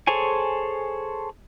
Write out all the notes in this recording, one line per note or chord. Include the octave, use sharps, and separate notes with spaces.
G#4 A4 C5 C#5 G#5